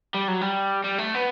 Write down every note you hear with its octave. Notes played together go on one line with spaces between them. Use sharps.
G3
F#3
G3
G3
A3
B3